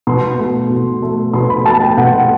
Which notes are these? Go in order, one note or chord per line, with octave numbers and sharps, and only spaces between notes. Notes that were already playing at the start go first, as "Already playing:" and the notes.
B2 C6
A3
B2
A3
B2 C6
B5
A3 A5
G5
B2 F#5